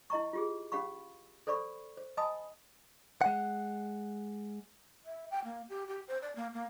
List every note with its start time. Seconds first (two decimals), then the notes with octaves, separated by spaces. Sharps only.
0.10 E4 D#5 A#5 C#6
0.33 F4 G4 G#4
0.72 C#4 G4 F5 B5 C#6
1.47 A4 C5 D5 B5 C#6
1.97 C5
2.17 D#5 G#5 A5 B5 D#6
3.21 G#3 F#5
5.05 E5
5.31 G5
5.44 A#3
5.69 G4
5.88 G4
6.08 C5
6.22 D5
6.36 A#3
6.54 A#3